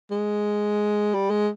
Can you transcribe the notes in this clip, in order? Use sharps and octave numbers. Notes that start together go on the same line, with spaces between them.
G#3
G3
G#3